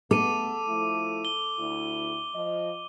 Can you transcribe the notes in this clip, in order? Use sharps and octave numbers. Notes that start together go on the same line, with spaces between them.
A3 B3 A4 D6 D#7
F3 A3 E4
G7
D2 E4
F3 D#5